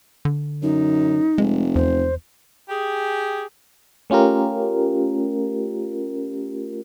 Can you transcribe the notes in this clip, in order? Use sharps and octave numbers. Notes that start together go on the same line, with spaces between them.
D3
F#2 D#4
F1 G#3
E2 C5
G4 G#4
A3 C#4 F4 G4 A#4